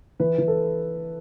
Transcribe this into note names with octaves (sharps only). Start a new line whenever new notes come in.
E3 B4
E3
A4